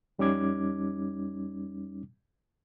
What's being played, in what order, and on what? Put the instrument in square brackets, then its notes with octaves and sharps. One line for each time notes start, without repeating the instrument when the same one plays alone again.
[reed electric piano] F2 G3 C#4 D#4 D6 G#6